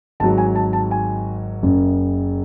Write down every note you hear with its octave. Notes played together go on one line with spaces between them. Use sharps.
G#1 G#2 F#3 A5
G#5
A5
A5
G#5
F#1 F#2 C#3